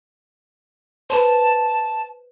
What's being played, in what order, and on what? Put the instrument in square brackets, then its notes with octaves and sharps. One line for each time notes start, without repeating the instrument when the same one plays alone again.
[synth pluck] B4 C5 [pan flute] A5